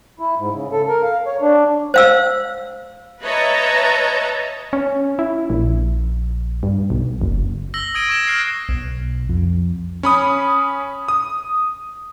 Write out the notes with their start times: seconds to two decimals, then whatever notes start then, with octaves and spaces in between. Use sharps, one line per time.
0.19 E4
0.38 G#2
0.54 C#3
0.72 A4
0.88 A#4
1.03 F5
1.26 C#5
1.42 D4
1.94 C5 F5 E6
3.22 B4 C#5 D#5 E5 A5 A#5
4.73 C#4
5.19 E4
5.50 A#1
6.63 G2
6.90 B1
7.21 F#1
7.74 E6 A#6 F#7
7.94 D#6 E6 G#6 D7 D#7
8.09 C#6 G#6 A#6 E7 G7
8.27 F6 F#6 G#6 C7 D7 E7
8.69 B1
9.29 F2
10.03 C#4 B5 D#6
11.08 D#6